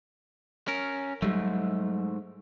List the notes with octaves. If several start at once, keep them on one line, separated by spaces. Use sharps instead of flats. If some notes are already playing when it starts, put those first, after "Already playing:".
C#4 A#4
G#2 F#3 G3 A3